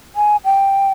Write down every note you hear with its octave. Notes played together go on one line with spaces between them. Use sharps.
G#5
G5